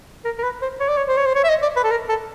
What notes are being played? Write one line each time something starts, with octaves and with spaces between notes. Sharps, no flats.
A#4
A#4
B4
C5
C#5
D5
C#5
C5
C#5
C5
C#5
E5
D#5
D5
B4
A4
A#4
A4